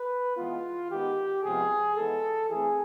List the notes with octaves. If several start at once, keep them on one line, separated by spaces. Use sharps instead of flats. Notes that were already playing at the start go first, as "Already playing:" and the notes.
Already playing: B4
E3 G#3 B3 F4
D#3 G#3 B3 G4
C3 F3 G#3 B3 G#4
E3 G#3 B3 A4
E3 A3 C4 G#4